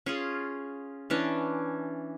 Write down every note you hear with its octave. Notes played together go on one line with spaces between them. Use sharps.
C#4 F4 G#4
E3 C#4 D4